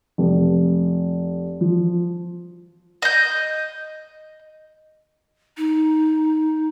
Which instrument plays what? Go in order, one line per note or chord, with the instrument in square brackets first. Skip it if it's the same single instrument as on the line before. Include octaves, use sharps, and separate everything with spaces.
[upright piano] F1
F3
[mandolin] D#5 G6
[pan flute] D#4